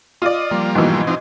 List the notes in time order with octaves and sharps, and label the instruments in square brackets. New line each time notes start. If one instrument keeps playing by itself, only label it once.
[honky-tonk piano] F4 D5 [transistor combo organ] D#5
[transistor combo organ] F3 G3 A#3
[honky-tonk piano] G#2 B2 E3
[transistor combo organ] F3 C4 D#4